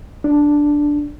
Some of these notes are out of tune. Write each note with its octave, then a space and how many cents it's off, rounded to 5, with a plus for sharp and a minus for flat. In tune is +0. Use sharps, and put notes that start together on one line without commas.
D4 +0